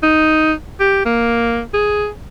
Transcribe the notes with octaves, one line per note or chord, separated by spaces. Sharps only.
D#4
G4
A#3
G#4